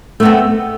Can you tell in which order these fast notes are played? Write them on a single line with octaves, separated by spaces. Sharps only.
A3 B3 C4